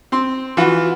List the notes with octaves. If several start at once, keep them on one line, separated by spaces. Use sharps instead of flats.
C4 C6
E3 F4 F#4